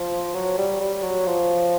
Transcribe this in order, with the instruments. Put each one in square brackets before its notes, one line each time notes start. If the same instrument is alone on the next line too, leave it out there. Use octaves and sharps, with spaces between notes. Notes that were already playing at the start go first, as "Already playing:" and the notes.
Already playing: [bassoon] F3
F#3
G3
G3
F#3
F3